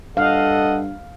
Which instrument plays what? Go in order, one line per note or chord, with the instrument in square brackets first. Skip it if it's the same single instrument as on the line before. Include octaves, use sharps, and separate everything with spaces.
[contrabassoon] G2 [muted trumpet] A4 [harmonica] D#5 F#5 [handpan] F5